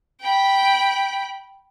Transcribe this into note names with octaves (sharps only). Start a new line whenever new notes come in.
G5 B5